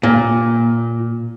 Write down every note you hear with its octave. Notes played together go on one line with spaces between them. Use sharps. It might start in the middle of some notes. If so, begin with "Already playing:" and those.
A#2